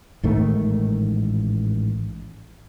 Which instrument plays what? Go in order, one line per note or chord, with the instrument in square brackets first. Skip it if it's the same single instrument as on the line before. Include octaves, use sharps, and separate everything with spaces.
[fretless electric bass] A1 G#2 D#3 A3